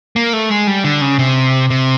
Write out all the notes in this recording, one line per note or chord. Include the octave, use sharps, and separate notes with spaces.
A#3
A3
G#3
G3
D3
C#3
C3
C3